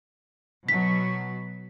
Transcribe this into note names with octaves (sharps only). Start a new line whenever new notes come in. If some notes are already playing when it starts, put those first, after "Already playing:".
B2 F#3 B6